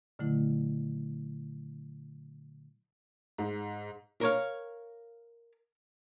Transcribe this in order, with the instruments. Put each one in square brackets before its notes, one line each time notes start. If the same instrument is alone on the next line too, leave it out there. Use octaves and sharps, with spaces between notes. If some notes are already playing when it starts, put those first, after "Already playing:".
[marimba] A#2 D3 D#3 F#3 A3 E4
[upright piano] G#2
[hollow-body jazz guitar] A#4 C#5 F5